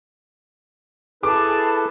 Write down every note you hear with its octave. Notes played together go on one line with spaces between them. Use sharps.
E4 G#4 A4 B4 A5 D6